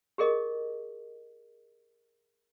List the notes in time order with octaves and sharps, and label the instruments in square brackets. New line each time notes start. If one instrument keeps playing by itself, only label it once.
[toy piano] G4 G#4 A#4 D#5